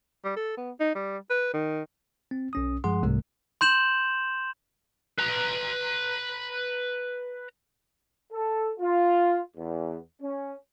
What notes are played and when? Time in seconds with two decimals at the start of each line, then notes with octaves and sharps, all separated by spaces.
0.25 G3
0.37 A4
0.57 B3
0.80 D#4
0.95 G3
1.30 B4
1.54 D#3
2.31 C4
2.53 B1 C#4 D#6
2.84 G2 F3 G#3 G#4 F#5 C6
3.03 C2 G#2 C3 G3 A3
3.61 C6 G6 E7 F#7
5.18 B4 A#5
8.32 A4
8.80 F4
9.57 E2
10.21 C#4